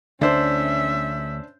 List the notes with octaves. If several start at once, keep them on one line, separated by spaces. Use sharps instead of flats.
D2 C#4 D4 C5 E5